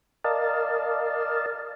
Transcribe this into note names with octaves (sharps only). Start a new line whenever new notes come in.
A#4 D5 D#5 F5 A5